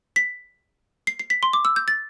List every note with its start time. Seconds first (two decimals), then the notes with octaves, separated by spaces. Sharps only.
0.16 B6
1.07 C7
1.19 C7
1.30 B6
1.43 C6
1.53 D6
1.65 E6
1.76 G6
1.88 A6